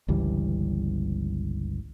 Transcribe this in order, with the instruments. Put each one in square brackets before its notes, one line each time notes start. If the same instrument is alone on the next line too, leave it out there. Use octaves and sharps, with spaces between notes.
[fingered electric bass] G1 C#2 E3 G3